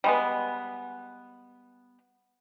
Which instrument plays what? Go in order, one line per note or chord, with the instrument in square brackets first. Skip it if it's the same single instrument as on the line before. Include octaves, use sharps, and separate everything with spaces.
[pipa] G3 G#3 B3